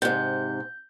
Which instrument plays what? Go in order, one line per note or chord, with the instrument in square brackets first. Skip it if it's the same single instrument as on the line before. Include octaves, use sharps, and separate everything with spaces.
[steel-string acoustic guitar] G#2 C3 [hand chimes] G6